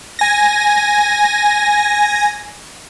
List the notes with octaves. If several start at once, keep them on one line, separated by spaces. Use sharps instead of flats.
G#5 A#6